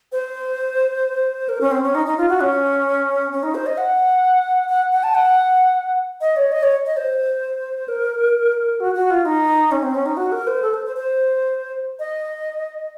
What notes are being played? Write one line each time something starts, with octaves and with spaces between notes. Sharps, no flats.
C5
A#4
C#4
C4
C#4
D#4
D#4
F4
F#4
C#4
C#4
D#4
C5
D#5
F#5
F#5
F#5
A5
F#5
D#5
C#5
D#5
C#5
D#5
C5
A#4
F#4
F#4
F4
D#4
C#4
C4
C#4
D#4
F#4
A#4
C5
A4
C5
C5
C5
D#5